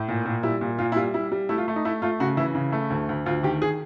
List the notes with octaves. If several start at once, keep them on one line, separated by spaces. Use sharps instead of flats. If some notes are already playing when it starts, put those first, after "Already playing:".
Already playing: A2
A#2
A#2
G3 E4
A#2
A#2 F4
E4
G3 F4
G3 E4
G3
A3 E4
F4
A3
D#4
A3 E4
A3 F4
C#3 F#4
E3 E4
C#3
A3
D2
D2
D2 F4
D#3 G4
G#4